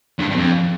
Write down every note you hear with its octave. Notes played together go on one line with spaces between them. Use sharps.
G2
G2
F2